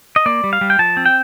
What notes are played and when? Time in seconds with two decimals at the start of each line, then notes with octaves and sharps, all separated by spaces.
0.16 D#5
0.26 A#3 D5
0.44 G3
0.53 F5
0.61 G3
0.70 G5
0.79 F3 A5
0.97 C4
1.06 G5